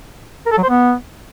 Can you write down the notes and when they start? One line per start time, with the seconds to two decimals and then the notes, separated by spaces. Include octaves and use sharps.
0.46 A#4
0.52 A4
0.58 F#3
0.63 C5
0.69 B3